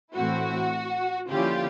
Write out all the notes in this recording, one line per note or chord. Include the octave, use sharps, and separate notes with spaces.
A2 E3 A3 C4 E4 F#4
D3 F3 A#3 C#4 E4 F4 G4